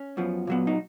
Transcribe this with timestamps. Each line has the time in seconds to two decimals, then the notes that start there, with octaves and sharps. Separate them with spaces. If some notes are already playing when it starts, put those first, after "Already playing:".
Already playing: C#4
0.17 F#2 F3 B3
0.47 A#2 F#3 B3
0.67 D#4